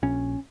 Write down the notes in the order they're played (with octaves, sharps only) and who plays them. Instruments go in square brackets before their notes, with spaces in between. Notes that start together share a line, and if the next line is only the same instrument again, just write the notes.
[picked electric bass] A#1 C#4